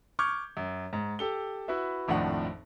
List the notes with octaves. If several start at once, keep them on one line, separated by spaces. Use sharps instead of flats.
C#6 D6 F6 G6 G#6
F#2
G#2
G4 A4 G7
E4 F#4 B4 E5
G#1 F2 A2 F3 D4 F#5